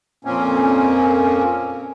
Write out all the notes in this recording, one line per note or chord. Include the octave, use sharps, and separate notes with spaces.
F2 A#2 A#3 C4 C#4